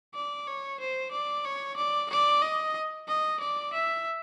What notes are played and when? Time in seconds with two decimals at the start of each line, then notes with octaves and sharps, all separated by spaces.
0.14 D5
0.48 C#5
0.80 C5
1.12 D5
1.45 C#5
1.77 D5
2.10 D5
2.42 D#5
3.08 D#5
3.40 D5
3.73 E5